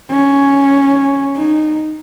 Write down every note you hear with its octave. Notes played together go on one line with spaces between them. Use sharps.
C#4
D#4